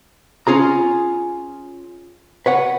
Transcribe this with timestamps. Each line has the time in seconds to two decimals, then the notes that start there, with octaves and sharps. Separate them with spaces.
0.47 C#4 F4 G#4 A#5
2.46 B4 C#5 F#5